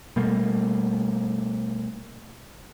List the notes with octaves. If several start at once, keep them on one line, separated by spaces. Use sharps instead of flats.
B2 G3 A3 A#3